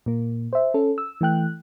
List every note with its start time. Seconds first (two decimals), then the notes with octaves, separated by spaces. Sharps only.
0.06 A#2 A#3
0.53 C5 E5
0.74 C#4 A4
0.98 E6
1.21 E3 A3 G5 F#6